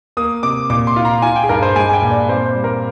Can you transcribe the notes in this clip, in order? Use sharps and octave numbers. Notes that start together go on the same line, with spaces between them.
A#3 D#6
C3 D6
A#2 D6
C6
F4
A#5
F4 G#5
G5
G#4
G2 A#4
C5
G#3 G#5
G#5
G5
A#2
D5
C4 C5
C5
G3
A#4